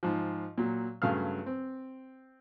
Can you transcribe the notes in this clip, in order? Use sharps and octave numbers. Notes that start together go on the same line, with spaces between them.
G#2 F3
A#2 F#3
G2 C#3 F#3 A3 F5 F6
C4